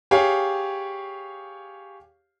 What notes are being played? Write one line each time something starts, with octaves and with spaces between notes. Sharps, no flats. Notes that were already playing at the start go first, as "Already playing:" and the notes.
G4 G#4 C#5 F5